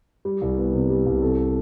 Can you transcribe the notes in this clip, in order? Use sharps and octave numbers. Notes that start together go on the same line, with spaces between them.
G3
C2
B3
C3
G3
C2
C3 A4